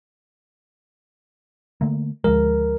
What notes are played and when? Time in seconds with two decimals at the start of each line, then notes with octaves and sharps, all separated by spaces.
1.81 D3 A3 A#3
2.24 D2 F3 G#3 A#4